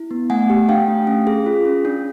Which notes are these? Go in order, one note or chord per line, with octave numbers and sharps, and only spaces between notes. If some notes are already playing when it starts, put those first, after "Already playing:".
Already playing: E4
B3
A3 F#5 G#5
G4
D4 F5 G5
A3
C#4
G#4
F4
C#4
D4